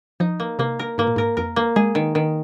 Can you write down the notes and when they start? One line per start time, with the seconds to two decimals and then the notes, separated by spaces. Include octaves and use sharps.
0.20 F3 D#4
0.40 A#3
0.59 C3 A#3
0.79 A#4
0.98 G#2 A#3
1.07 A#2
1.16 G#2 A#4
1.37 F2 A#4
1.56 A#3
1.76 G#3 G#4
1.95 D#3
2.15 D#3